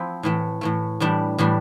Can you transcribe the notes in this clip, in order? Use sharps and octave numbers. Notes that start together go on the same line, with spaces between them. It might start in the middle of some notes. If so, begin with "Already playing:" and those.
Already playing: F3 C4 E4
A2 E3 A3
A2 E3 A3
A2 E3 G3 D4
A2 E3 G3 D4